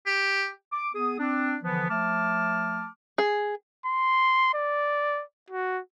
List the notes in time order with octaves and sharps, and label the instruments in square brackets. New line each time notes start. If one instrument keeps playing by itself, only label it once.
[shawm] G4
[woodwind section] D6
B3 G#4 D#6
C4 D4
D3 E3 F3 B3
F3 A3 A5 D6 F6
[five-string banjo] G#4
[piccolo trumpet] C6
D5
F#4